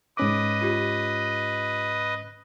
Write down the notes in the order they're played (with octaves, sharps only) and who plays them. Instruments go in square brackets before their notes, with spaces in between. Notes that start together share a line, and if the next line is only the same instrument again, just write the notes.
[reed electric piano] G#2 C#4 D6 [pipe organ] B4 D#5
[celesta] F4 G4